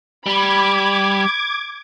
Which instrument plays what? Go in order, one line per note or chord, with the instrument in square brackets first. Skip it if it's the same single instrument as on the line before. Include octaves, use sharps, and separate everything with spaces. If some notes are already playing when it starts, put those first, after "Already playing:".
[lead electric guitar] G3 [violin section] B5 [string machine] D6 G#6